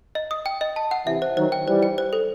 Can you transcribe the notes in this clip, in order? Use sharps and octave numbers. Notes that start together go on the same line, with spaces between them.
D#5
D#6
G5
D#5
A5
F#5
C3 E3 E5
C5
D#3 F#3 C5
G5
E3 G3 C5
G5
C5
A4